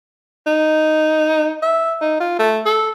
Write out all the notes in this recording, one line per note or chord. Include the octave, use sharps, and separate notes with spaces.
D#4
E5
D#4
F4
A3
A4